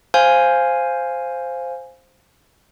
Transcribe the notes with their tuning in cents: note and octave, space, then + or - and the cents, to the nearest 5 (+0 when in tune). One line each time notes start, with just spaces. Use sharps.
C5 +0 F5 +0 G#5 +0